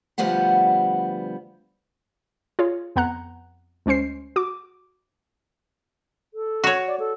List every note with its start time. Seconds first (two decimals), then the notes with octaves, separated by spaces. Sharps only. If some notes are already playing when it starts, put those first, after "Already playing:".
0.18 D2 F3 G3 B3 F#5
2.59 F4 G#4 C#5
2.96 F2 B3 F#5 A#5 F#6
3.86 D2 G#3 C#4 C5 C7
4.36 F#4 D6
6.34 A4
6.64 F#4 C#5
6.88 D5
6.99 A4